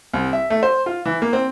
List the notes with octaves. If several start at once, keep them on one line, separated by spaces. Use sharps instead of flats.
C2
E5
A3
C5
F4
E3
A#3
C4